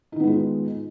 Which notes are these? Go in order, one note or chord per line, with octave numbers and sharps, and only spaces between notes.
D#3 G#3 B3 D#4 F4